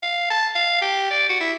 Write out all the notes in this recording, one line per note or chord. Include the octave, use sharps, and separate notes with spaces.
F5
A5
F5
G4
D5
F#4
E4